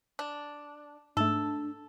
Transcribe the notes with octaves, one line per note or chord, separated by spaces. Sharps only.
D4
G#2 A3 D4 A4